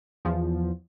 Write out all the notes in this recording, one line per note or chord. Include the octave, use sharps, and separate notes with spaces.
E2 F3